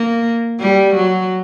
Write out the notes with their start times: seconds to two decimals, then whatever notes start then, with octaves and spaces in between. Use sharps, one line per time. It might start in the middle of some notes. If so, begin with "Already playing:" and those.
Already playing: A#3
0.60 G3
0.95 F#3